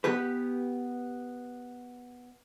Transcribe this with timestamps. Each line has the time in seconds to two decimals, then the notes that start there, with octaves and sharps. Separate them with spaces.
0.04 B3 G4 B4